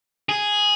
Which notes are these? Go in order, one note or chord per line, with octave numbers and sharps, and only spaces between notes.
G#4